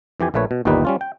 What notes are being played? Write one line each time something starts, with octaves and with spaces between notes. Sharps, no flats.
F2 E3 G4 G#5
A#1 A#2 A3 B4 C#5
B2
G1 D#2 A#2 G3 D#4 B4
G3 C#4 F4
G5